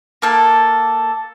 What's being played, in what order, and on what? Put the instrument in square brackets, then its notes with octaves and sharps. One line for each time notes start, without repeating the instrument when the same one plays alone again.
[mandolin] A#3 A4